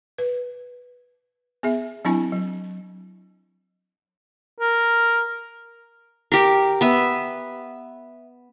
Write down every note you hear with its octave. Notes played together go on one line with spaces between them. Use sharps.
B4
B3 G#4 E5
F#3 C4 D4 E4 G#5
F#3
A#4
G4 A#4
B3 E5